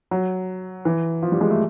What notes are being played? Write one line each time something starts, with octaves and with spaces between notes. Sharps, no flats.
F#3
E3
F3
G3
G#3
A3